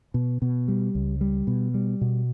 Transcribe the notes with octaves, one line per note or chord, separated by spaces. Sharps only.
B2
B2
G3
C#2
G3
B2
G3
B2